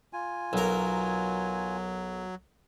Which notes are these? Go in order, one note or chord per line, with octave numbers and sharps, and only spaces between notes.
F4 G#5
B1 F#3 A#4